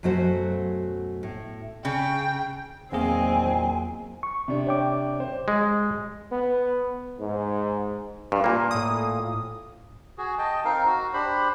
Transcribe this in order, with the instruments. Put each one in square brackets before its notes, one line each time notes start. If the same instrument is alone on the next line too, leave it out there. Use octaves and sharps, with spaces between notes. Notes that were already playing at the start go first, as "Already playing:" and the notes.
[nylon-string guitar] F#2 B2 F#3 A3 F#4 C5
A2
[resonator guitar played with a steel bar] C#3 [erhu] G5
[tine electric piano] E2 A#3 G#4 [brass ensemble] A#2 D#3 [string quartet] F#3 C4 [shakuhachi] G#5
[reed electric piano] C#6
[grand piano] C3 D4
[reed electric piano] C#5 G5 D6
[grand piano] C5
[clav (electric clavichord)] G#3
[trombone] B3
G#2
[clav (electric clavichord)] G2
A#2 A#3
[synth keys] A2 D#6
[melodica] F#4 G#4
D#5 G5 A5
C4 D#4 A#4 F5
F#4
D4 G4 C5 B5